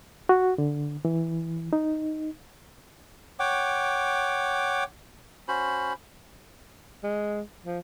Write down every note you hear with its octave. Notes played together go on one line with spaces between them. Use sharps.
F#4
D3
E3
D#4
C#5 F#5 G5 D6
C#4 F#4 C5 B5
G#3
F3